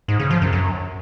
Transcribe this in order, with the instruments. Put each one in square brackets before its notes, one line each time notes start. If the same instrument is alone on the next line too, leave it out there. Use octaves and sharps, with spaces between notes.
[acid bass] G#2
C#3
F3
F#2
F#2